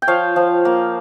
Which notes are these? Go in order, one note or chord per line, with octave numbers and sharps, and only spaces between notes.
G5
F3 C#5 F5
F3
A#3